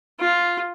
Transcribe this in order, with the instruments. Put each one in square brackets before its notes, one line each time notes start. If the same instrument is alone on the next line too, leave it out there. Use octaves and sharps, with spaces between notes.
[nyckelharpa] F4